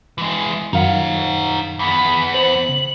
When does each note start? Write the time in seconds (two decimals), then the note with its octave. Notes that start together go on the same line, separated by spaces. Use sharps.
0.18 E3 G#3
0.73 F#2 D#3 D#4 F5 F#5
1.79 E2 B3 B5
2.34 C5 F#7
2.69 C#3